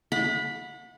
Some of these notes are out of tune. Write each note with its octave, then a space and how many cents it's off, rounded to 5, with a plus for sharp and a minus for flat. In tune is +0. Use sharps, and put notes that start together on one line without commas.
F#5 -35 B5 +0